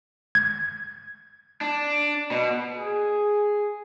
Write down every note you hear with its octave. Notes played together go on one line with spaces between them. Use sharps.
G#6
D4
B2
G#4